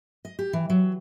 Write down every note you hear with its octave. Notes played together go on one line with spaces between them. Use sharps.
D#5
G4
E3
F#3